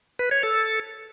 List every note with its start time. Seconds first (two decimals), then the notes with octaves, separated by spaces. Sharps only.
0.19 B4
0.31 C#5
0.43 A4